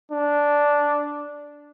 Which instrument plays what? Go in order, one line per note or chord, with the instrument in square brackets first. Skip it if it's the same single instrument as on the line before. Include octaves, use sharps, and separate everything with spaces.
[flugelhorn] D4